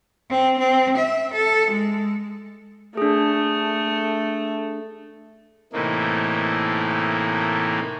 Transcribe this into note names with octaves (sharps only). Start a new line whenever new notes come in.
C4
C4
E5
A4
G#3
A3 D4 G#4
A2 C3 E3 A3 A#3 D#4